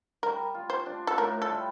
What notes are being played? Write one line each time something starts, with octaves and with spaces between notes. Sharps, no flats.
G3 A#4
F4
C5
D4
A4
A2 A#4
A4
G3